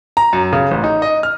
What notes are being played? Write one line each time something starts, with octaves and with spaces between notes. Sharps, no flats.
A#5
F#2
C#3
A1
D#4
D#5
F6